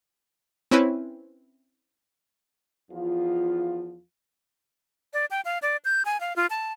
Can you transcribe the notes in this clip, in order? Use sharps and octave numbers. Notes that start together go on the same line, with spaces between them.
C4 C#4 E4 B4
E2 F3 F4
D5
G5
F5
D5
G6
G#5
F5
F4
A5